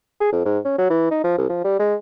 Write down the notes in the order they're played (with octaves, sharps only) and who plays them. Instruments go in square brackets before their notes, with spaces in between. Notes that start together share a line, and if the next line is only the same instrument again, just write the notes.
[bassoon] G#4
F2
G#2
C#4
F#3
E3
D#4
F3
C2
F3
G3
G#3